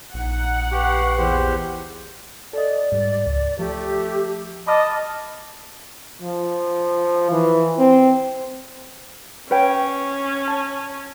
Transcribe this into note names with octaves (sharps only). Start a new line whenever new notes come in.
A#1 D#4 F#5
G4 B4 F5 C#6
E2 E4 G4 C5
A4 D5 D#5
G#2 G3
C#2
F3 A3 G4
D#5 A5 B5 D6 F6
F3
E3
C4
C#4 B4 C#5 G5
A5